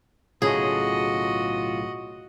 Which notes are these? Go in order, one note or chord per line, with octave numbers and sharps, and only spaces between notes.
B1 A2 C#3 F4 F#4 G#4 D#5